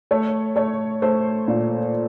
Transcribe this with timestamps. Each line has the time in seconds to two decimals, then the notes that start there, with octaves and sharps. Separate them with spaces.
0.11 A3 C#5
0.56 A3 C#5
1.02 A3 C5
1.48 A#2